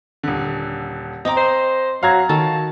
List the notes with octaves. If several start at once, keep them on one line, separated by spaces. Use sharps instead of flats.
D#1 D3
C4 D#5 A#5 D6
C5
F#3 F5 A#5 G#6
D#3 F#4 A4 A5